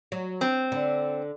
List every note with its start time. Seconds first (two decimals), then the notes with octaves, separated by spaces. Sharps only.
0.12 F#3
0.41 C4
0.72 D3